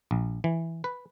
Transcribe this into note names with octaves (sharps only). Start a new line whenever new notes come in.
A#1
E3
B4